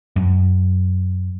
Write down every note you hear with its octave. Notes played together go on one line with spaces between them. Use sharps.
F#2